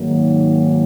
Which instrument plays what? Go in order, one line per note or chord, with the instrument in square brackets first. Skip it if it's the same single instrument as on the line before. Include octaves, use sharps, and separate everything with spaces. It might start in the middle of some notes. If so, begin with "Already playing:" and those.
Already playing: [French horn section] G#2 D#3 F#3 A#3